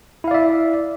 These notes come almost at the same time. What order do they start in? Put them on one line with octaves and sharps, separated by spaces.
E4 F5 D5 E5